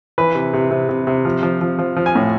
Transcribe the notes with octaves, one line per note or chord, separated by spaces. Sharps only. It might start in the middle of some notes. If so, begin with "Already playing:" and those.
E3 B4
C3
C3
C3
C3
C3
F3
F3
F3
F3
F3
G#5
A2